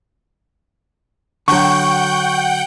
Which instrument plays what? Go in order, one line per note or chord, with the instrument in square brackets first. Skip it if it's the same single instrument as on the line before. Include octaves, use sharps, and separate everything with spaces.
[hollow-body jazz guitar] D3 F#3 [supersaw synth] F#5 G5 G6 [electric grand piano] C#6